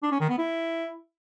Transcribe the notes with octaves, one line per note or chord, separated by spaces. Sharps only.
D4
C#4
D#3
B3
E4